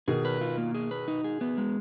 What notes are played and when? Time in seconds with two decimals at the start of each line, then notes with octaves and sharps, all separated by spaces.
0.08 B2 D#3 G#4
0.25 B4
0.41 F4
0.58 A#3
0.74 G#4
0.91 B4
1.08 D#4
1.24 G#4
1.41 B3
1.58 G#3